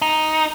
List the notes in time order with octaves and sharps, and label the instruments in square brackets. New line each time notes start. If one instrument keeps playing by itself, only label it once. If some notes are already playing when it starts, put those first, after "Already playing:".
[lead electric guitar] D#4